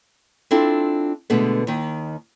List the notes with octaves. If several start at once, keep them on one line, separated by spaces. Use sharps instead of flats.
C4 D4 E4 F4 A4
B2 D3 G#3 A3 B3
D#2 D#3